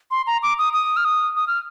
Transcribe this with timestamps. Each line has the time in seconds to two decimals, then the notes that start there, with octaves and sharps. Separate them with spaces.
0.11 C6
0.27 A#5
0.43 D6
0.58 D#6
0.73 D#6
0.97 F6
1.05 D#6
1.36 D#6
1.47 F6